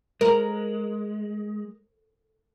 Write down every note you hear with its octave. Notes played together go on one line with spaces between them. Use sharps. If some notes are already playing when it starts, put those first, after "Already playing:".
G#3 A#4